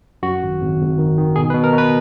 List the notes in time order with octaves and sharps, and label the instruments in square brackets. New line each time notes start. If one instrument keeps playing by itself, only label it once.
[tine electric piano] F#2 F#4
G#1
G#1
G#1
D#3
D#3
B2 G#4
B4
B2
A#4
B2 B4